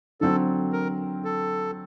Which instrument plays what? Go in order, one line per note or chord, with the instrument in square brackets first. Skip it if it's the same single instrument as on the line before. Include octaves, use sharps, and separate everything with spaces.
[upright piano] D3 F#3 C4 [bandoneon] A4
[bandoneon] A#4
A4